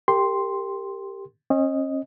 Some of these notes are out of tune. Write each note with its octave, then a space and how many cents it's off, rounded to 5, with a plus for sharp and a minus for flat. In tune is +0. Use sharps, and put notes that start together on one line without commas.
G4 +10 A#4 -30 C6 +0
C#4 -40 D#5 +0